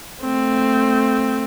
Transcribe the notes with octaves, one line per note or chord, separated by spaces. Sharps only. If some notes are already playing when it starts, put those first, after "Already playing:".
A3 C4